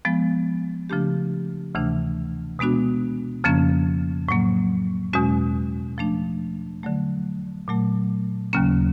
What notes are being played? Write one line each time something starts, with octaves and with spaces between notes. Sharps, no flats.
F3 G#3 B3
C#3 F3 A3 D4 G4
D2 C3 E3 A3 D4
B2 G#3 B3 D4 F#4
F2 C#3 F3 A#3 C#4
A2 F#3 A#3
E2 B2 G#3 C#4 F#4
F3 A3 D4
D3 F#3 A3
A#2 F#3 A3
D#2 C#3 F#3 A#3 C#4